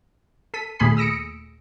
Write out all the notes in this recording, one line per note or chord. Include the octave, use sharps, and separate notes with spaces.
A4 B6 D#7
D#2 A#2 A3 G#4 B5 C7
D#6 E6 A#6 C#7 D7